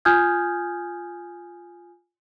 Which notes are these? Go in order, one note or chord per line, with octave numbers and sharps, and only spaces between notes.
F4 G#5 D#6 F6 G6 G#6